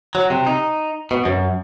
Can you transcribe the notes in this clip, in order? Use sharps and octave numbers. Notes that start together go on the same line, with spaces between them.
F#3
C3
D#4
B2
F#2